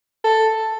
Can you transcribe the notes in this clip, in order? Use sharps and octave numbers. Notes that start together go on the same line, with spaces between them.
A4